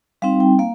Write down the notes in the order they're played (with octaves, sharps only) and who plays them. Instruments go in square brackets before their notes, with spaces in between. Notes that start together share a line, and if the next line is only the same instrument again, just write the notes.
[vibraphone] G3 C4 D#4 F5
G5
A#3 F5